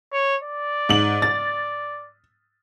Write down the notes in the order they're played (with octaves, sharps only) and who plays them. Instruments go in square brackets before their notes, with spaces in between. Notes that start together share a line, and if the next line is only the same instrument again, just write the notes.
[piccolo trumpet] C#5
D5
[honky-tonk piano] G#2 F#7
A6